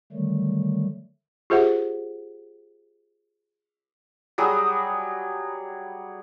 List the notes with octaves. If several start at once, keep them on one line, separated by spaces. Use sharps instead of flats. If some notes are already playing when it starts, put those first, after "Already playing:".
D3 D#3 F#3 G3 A3
F4 G4 G#4 C5 E5 F#5
F#3 G3 G#4 D#6